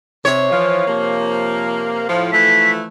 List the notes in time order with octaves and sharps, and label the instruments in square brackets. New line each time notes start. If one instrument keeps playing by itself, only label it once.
[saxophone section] C3 [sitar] C#5
[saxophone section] E3 F3
C3 F3 A#3
A2 F3
[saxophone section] E3 F3 A3 [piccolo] B6